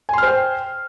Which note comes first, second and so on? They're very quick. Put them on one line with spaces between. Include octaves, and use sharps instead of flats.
G#5 C6 F6 C5 G5